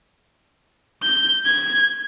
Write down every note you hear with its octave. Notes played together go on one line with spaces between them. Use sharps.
G6
G#6